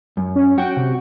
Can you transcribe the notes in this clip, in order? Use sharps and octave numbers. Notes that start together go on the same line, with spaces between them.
F#2
C#4
F#4 G5
C3